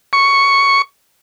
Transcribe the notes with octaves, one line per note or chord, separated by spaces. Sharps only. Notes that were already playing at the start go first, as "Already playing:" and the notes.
C#6